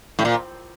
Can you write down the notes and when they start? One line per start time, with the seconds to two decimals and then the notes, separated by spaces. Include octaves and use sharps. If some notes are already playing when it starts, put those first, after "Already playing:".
0.19 A2
0.25 A#2